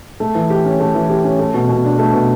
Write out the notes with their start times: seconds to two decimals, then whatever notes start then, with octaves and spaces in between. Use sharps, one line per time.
0.20 A3
0.35 E3
0.50 G4
0.65 C#4
0.80 A3
0.95 E3
1.09 G4
1.24 C#4
1.39 A3
1.54 B2
1.69 B2
1.84 D4
1.99 A3
2.13 B2